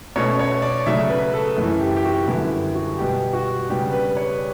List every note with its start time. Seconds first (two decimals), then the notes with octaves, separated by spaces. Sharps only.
0.16 B2 A3 C#4 C#5
0.39 C#5
0.62 D5
0.86 C#3 F#3 A3 E5
1.09 B4
1.34 A4
1.57 F#2 E3 A3
1.81 G4
1.96 G4
2.04 F#4
2.28 F#2 D3 G3 B3 E4
2.75 F#4
2.98 B2 G3 B3 G4
3.33 F#4
3.70 C#3 G3 B3 D4 G4
3.93 B4
4.17 C#5